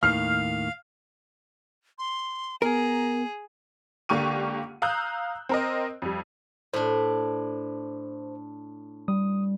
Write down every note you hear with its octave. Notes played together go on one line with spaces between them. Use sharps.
D#2 A2 D#3 F5 F6 C7
C6
B3 G#4 A#4 A#5
C#2 D3 A#3 G4 C#6 D#7
F5 A#5 D#6 E6 F#6 G6
C4 A#4 D#5
F2 G3
A2 D4 C5
G3 D#6